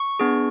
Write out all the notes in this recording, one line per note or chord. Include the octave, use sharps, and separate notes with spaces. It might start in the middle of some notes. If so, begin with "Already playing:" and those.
Already playing: C#6
B3 D4 G#4